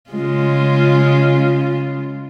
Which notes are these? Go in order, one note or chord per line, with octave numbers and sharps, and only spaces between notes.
C#3 G#3 F4